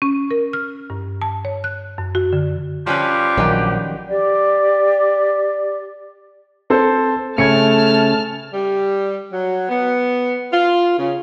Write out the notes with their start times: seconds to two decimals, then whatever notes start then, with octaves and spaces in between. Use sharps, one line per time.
0.02 C#4
0.31 A#4
0.53 F6
0.90 G2
1.22 A5
1.45 C#5
1.64 F#6
1.98 F#2
2.15 F#4
2.33 D3
2.87 F3 G3 C#4 G4 B4
3.37 A#1 D#3 F#3 B4
4.09 G4 D5
6.70 C4 A4 C5
7.38 C#3 A3 A5 F6 G#6 C#7
8.53 G3
9.32 F#3
9.69 B3
10.52 F4
10.98 C#3